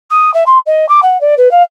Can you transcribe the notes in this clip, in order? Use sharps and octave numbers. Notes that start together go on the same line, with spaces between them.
D#6
E5
C6
D#5
D6
F#5
D5
B4
F5